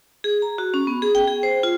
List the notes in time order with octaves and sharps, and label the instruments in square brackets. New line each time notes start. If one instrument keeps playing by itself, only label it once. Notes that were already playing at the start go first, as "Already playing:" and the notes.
[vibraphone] G#4
A#5
F#4
C#4
B3
G#4
G5
G#4
C5
F4